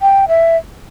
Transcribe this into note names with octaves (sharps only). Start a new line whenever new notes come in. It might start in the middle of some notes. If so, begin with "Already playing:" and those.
G5
E5